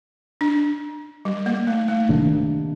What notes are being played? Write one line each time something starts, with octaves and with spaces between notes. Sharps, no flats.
D4
G3
A#3
A3
A3
C3 D#3 A#3 D4